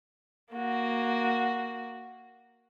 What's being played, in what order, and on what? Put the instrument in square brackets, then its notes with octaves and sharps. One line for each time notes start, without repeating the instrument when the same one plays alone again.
[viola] A#3 F#4